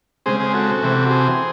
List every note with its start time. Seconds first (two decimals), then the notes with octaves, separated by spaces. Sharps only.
0.26 C#3 G#3 C4 G#4 C5
0.40 G#4 C5
0.54 F#4 A4
0.83 C3 E3 C4
1.10 G#4 C5